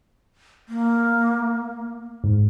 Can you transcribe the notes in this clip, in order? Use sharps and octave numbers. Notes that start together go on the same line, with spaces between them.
A#3
G#2